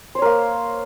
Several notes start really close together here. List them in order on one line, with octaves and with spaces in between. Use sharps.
C5 C#5 A#4 A#3